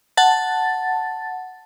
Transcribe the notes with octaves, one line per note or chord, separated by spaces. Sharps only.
F#5 A5 A6